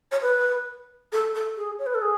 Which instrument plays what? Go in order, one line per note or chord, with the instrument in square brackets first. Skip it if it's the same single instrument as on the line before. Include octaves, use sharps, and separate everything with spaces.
[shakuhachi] C#5
B4
A4
A4
G#4
C#5
B4
A4
G#4